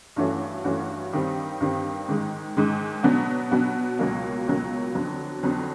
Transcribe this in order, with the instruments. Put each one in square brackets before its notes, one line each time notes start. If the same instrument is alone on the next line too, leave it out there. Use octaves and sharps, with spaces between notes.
[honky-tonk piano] G2 E3 A3 C#4 F#4
G2 E3 A3 C#4 F#4
G2 D#3 G3 C4
G2 D#3 G3 C4
G#2 D#3 G#3
G#2 D#3 G#3
B2 F#3 B3 D4 F#4
B2 F#3 B3 D4 F#4
C#2 B2 F#3 A#3
C#2 B2 F#3 A#3
F2 D3 F#3 B3
F2 D3 F#3 B3